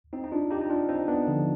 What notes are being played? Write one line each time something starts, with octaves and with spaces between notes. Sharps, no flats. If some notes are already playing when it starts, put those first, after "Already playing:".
C4 D#4
D#4
D4 F4
D#4 G4
D#4
D4 F4
C4 D#4
B3 D4
D3 F3